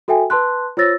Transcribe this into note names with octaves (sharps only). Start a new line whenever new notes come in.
F#4 A4 E5 G5 G#5
B4 A5 C6 F#6
F4 C5 C#5 E6 A6 A#6